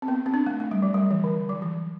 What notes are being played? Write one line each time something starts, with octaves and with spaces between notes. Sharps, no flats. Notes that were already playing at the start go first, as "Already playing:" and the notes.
C4
B3
C4
D4
A3
A3
G3
F#3
G3
E3
D3
F#3
E3